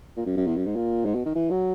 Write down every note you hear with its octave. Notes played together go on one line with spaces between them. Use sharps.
A#2
F#2
F#2
E2
F#2
G#2
A#2
G#2
B2
D#3
E3
F#3